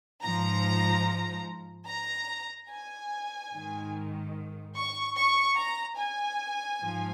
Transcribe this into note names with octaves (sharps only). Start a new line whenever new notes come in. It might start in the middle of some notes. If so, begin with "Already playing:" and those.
G#2 F3 A#5
A#5
G#5
G#2 D#3
C#6
C#6
A#5
G#5
G#2 F3